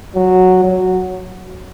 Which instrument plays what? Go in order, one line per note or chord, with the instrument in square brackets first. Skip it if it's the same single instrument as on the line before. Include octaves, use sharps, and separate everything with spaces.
[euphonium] F#3
F#3